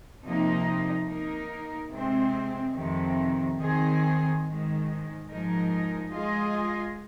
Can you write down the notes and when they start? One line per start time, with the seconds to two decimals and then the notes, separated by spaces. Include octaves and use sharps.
0.23 C3 F3 A#3 D#4
1.07 A#3 D#4 A#4
1.91 C3 G#3 C4
2.75 F2 C3 D#3
3.60 D#3 C4 G#4
4.45 G#2 D#3 G#3
5.29 G#2 F3 G#3 D#4 A#4
6.13 G#3 F4 G#4 D#5